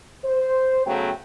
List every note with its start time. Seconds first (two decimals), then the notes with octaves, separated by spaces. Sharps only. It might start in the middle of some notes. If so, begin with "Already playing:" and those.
0.24 C5
0.86 C#3 F#3 A3 B3 G5